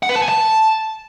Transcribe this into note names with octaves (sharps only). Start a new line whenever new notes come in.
F#5
B4
A5
G#5
A5